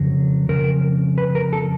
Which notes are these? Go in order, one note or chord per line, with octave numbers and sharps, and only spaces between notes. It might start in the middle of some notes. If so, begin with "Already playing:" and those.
Already playing: F2 C#3 F#3
F2 C#3 A#4
B4
A#4
A4